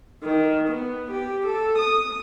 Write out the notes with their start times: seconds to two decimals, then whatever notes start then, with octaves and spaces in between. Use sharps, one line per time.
0.22 D#3
0.67 B3
1.10 G4
1.46 A4
1.78 D#6